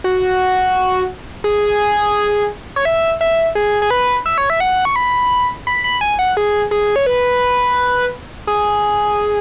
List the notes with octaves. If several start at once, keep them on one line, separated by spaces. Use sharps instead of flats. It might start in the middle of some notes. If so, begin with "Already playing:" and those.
F#4
G#4
C#5
E5
E5
G#4
G#4
B4
E5
C#5
E5
F#5
C#6
B5
B5
B5
G#5
F#5
G#4
G#4
C#5
B4
G#4